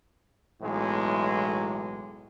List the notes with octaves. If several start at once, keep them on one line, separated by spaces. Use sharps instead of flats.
B1 A2 E3 G#3